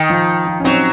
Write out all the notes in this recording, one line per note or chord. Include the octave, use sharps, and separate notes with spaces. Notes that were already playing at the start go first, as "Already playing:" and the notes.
Already playing: D#3
F3
F3
C#4
F#3 C4 D#4